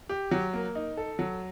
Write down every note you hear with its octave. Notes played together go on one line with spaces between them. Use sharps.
G4
F#3
A#3
D#4
A4
F#3